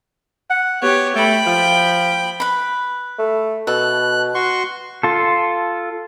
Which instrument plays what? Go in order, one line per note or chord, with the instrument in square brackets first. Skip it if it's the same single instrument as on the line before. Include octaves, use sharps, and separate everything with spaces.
[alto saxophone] F#5
[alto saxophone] B3 [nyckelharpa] G4 C#5
[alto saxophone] A3 [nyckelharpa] G5 B5
[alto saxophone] F3
[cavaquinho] B4 B5
[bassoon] A3
[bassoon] B2 [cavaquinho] A4 [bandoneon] F#6
[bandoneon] F#4 C6 C#6
[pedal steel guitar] F4 A4